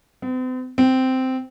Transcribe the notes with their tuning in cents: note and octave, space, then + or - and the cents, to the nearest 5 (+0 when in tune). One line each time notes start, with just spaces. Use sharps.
C4 -45
C4 -10